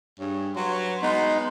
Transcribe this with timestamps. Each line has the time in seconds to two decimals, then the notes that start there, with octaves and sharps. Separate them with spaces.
0.19 G2 G#4 C#5
0.56 F#3 B4 C#5 C6
1.02 G#3 B3 D#4 B4 C6